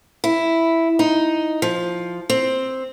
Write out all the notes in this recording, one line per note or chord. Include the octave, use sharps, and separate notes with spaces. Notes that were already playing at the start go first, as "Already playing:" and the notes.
E4
D#4
F3
C4